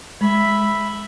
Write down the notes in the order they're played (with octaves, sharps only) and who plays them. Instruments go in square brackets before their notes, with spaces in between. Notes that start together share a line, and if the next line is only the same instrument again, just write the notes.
[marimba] G#3 [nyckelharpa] E5 B5